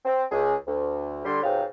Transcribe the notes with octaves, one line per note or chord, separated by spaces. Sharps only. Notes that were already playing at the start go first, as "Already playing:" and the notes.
C4
C#2 G#4
D2
D3 G3 C6
C#2 G#2 C3 F#3 F5 G5